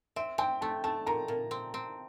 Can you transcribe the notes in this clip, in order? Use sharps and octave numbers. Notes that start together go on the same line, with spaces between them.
C4 E5
C4 G5
A3 A5
A3 A5
A#2 A#5
A#2
C4
C4